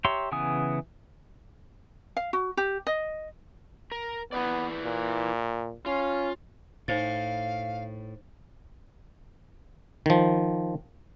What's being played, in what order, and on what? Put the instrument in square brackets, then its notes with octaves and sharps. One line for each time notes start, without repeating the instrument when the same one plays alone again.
[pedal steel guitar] G4 C#5 E5 A#5 C6
C#3 E3 B3 G#5 D#6
[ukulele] F5
F#4
G4
D#5
[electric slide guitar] A#4
[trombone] B3 [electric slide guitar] E4 B4 D5
[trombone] A#2
[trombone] C#4 [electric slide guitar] F4
[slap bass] A2 [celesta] D#4 C5 A6 [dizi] F5
[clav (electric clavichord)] D#3 F3